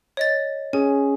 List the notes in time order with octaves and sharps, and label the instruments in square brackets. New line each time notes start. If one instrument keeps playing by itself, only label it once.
[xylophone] C#5 D#5 A6
[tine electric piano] C#4 G#4 [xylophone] G#5